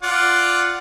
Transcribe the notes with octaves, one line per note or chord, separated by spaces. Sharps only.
F4 D5 F#5